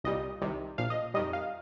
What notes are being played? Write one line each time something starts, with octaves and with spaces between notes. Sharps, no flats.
C2 A#2 G3 D#5
C2 C3 D#3 G3
A#1 A#2 F3 F5
D#5
F2 D#3 G3 D#5
F5